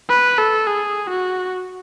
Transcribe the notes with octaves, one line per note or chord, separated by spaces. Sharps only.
B4
A4
G#4
F#4